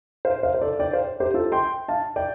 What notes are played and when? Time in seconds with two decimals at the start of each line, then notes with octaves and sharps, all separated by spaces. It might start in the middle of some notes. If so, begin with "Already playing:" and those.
0.25 C5 F5
0.43 C5 F5
0.54 C5
0.62 A4 D5
0.79 D5 G5
0.93 C5 F5
1.20 G4 C5
1.34 F4 A4
1.52 G5 C6
1.88 F5 A5
2.16 D5 G5